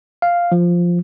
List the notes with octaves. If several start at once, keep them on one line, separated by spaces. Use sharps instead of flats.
F5
F3